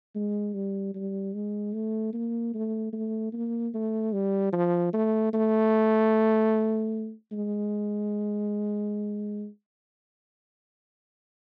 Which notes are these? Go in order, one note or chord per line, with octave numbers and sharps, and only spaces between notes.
G#3
G3
G3
G#3
A3
A#3
A3
A3
A#3
A3
G3
F3
A3
A3
G#3